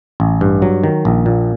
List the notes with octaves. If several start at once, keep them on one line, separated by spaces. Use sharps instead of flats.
A1
G2
F#3
D#3
A#1
A#2